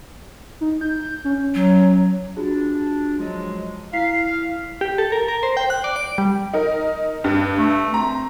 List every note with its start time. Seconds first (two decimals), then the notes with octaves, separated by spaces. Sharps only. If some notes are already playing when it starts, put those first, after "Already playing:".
0.61 D#4
0.81 G6
1.25 C#4
1.55 F#3
2.37 D4 F4 F#4 G#4
3.19 F3 F#3 G#3
3.93 E4 F5 B6 C7
4.81 G4
4.98 A4
5.12 A#4
5.28 A#4
5.43 C5
5.57 G5
5.70 F#6
5.84 D5
5.96 D7
6.18 G3
6.53 D#4 A#4
7.24 G2
7.59 A3
7.94 C4 A#5